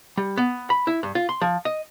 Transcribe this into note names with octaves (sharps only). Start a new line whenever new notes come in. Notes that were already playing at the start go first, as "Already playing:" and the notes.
G3
B3
B5
E4
G2
F4
C6
F3
D#5